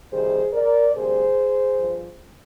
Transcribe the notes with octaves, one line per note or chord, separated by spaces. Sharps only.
F2 C3 D#3 G3 G#4 C5
A#4 D5
D2 C3 G3 G#4 C5
G2 F3